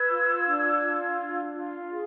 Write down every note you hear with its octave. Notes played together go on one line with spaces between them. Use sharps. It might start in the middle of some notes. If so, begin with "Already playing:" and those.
Already playing: B4 E6 G#6
F4
D4
F4
D4
F4
G#4